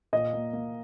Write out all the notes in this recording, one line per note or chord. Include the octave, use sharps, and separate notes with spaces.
A#2 D#5
A#3
A#3